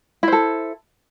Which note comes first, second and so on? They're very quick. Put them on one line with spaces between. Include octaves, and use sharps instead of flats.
E4 C5 A4